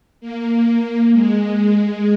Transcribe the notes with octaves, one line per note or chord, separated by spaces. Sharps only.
A#3
G#3